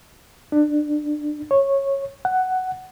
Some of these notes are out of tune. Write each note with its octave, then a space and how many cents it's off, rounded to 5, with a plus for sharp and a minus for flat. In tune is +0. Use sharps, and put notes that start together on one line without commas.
D4 +25
C#5 -15
F#5 +10